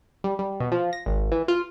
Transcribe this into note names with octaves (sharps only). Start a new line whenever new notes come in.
G3
G3
B2
F3
A#6
G#1
E3
F4